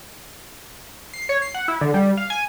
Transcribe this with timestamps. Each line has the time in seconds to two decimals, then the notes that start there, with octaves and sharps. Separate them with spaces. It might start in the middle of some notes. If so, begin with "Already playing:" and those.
1.13 C7
1.29 C#5
1.42 C7
1.54 F#5
1.68 E4
1.81 D3
1.94 G3
2.17 F5
2.30 G#5